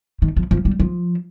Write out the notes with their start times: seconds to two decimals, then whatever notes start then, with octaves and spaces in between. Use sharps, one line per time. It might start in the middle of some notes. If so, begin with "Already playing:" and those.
0.22 D#3
0.37 F3
0.51 F3
0.65 G3
0.80 F3